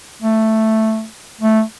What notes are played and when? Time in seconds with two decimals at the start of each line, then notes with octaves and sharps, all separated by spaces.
0.22 A3
1.41 A3